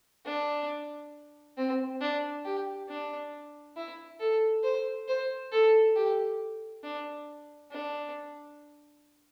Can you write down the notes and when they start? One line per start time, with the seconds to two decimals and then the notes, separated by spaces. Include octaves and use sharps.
0.25 D4
1.57 C4
2.01 D4
2.45 G4
2.89 D4
3.76 E4
4.20 A4
4.64 C5
5.08 C5
5.52 A4
5.96 G4
6.83 D4
7.71 D4